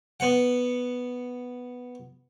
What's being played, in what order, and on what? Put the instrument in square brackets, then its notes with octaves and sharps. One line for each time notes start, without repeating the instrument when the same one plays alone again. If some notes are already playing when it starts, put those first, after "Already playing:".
[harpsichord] B3 F#5